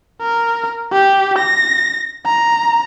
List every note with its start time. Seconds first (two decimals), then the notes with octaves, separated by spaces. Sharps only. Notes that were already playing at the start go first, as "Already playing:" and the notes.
0.21 A#4
0.93 G4
1.39 A#6
2.26 A#5